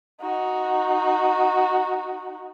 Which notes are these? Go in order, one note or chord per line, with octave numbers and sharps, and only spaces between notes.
D#4 F#4